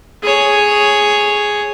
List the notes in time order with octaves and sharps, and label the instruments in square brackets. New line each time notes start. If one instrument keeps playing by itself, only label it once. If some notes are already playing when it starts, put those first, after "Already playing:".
[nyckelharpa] G#4 C#5